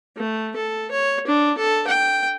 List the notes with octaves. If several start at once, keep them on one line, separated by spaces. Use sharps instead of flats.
A3
A4
C#5
D4
A4
G5